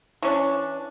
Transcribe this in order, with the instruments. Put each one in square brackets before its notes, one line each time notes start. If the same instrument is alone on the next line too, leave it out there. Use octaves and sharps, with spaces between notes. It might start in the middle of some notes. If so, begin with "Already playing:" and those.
[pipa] E3 C#4 D4